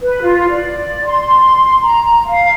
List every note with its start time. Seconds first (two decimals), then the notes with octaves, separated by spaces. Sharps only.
0.01 B4
0.22 F4
0.49 D5
1.05 C6
1.83 A#5
2.26 F5